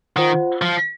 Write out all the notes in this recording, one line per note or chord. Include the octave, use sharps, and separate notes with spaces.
D#3 F4 C5 F#5
F3